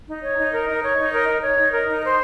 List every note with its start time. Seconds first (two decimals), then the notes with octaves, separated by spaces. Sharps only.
0.08 D#4
0.22 C#5
0.38 D#4
0.52 A#4
0.68 D#4
0.83 C#5
0.98 D#4
1.13 A#4
1.28 D#4
1.43 C#5
1.58 D#4
1.73 A#4
1.88 D#4
2.03 C5